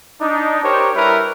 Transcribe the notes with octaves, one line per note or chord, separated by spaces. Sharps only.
D4 D#4
G4 A#4 C5 C#5
G3 E4 A#4 B4